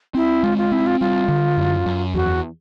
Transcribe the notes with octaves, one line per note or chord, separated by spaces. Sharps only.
C4 E4
G#3 F4
F4
C4 E4
F4
G3 F4
D3
F#2
F#2
E2 F#4